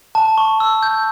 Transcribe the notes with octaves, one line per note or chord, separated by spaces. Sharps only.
A5
C#6
E6
G6